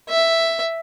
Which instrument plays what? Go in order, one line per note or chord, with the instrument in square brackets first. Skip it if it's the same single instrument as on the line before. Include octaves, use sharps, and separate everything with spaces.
[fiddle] E5